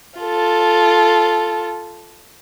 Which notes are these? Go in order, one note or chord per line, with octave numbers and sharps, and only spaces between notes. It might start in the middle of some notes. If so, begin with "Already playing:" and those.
F4 A4